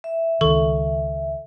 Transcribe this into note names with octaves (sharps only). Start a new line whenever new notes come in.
E5
C#2 D#3 A4 C#6